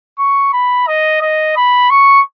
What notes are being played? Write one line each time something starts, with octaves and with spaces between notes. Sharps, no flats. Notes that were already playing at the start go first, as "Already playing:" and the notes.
C#6
B5
D#5
D#5
B5
C#6